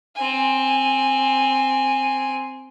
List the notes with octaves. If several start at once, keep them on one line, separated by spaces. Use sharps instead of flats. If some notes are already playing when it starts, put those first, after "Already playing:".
C4 G#5